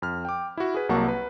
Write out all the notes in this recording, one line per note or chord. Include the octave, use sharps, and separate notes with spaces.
F2 F6
G5 D6
E4 F#4
G#4 B4
C2 F#3 A#3 F#5 A5 C#6
B4